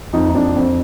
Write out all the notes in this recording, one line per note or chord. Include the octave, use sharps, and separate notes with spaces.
F2 D#4
D#4
F2 D4
F2 C4